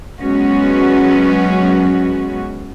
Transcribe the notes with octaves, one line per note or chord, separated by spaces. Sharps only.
F#3 G#3 B3 C#4 F#4